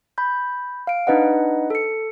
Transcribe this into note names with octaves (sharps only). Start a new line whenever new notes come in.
B5 G6
F5 D7
D4 D#4 B4 D#5 F#5
A4 C#7